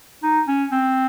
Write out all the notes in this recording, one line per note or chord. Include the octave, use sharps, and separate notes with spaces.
D#4
C#4
C4